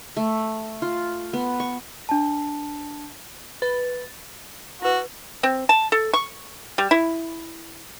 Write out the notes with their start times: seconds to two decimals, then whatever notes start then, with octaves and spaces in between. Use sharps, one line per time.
0.17 A3
0.82 F4
1.33 B3
1.60 C#6
2.09 D4 A5
3.62 B4 A6
4.82 E4 F#4 B4
5.43 C4
5.69 A5
5.92 A4
6.13 C#6
6.78 G3
6.91 E4